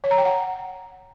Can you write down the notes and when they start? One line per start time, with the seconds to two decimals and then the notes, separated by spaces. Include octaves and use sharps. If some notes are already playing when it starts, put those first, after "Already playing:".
0.04 C#5
0.11 A#5
0.18 G5
0.25 F#5